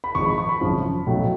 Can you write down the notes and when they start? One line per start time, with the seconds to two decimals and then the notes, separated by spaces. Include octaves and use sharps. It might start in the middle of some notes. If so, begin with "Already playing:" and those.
0.04 B5
0.15 G#1 G#2 F3 C#6
0.26 B5
0.38 C#6
0.49 B5
0.61 G#1 F#2 C#3 F3
1.06 B1 A2 F#3